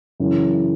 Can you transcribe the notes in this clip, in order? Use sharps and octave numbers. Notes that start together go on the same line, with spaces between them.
F#2 C#3 E3